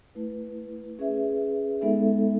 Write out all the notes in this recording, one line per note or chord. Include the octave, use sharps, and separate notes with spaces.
A3 E4 B4
C#4 G#4 B4 E5
G#3 B3 D#4 A4 E5